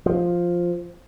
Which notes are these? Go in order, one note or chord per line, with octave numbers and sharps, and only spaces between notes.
F3